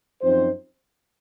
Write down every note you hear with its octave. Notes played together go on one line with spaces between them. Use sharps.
F#2 F3 C4 D#4 C5